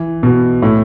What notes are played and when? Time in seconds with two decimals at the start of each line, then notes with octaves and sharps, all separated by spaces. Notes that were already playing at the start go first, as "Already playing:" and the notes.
Already playing: E3
0.23 B2
0.62 A2